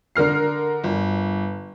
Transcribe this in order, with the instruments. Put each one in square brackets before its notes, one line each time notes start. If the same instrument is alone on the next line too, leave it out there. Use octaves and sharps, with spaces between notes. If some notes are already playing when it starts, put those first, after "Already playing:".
[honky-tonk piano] D3 A#4 F6 C7
G1